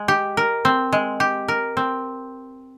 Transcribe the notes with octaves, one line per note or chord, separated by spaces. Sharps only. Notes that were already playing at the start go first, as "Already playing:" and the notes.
Already playing: G#3
G4
A#4
C4
G#3
G4
A#4
C4